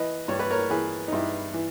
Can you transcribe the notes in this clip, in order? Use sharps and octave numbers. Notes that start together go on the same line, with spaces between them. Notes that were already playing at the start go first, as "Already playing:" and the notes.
Already playing: E3 B4 D#5
G2 C#5
B4
A#4 C#5
E3 G#4 B4
D#4
G2 E4
E3